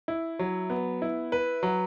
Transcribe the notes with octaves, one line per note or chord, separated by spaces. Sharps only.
E4
F#3
B3
E4
B4
F#3